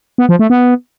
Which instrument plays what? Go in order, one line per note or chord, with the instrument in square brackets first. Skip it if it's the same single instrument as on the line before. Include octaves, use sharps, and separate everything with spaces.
[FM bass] B3
F3
A3
B3